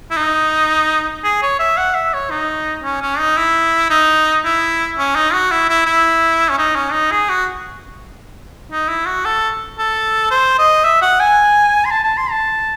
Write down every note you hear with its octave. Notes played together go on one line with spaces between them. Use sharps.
E4
D#4
G#4
C#5
E5
F#5
E5
C#5
D#4
C#4
C#4
D#4
E4
D#4
E4
C#4
D#4
F#4
E4
E4
E4
C#4
D#4
C#4
D#4
G#4
F#4
D#4
E4
F#4
A4
A4
C5
D#5
E5
F#5
G#5
C6
A5
A5
C6
A5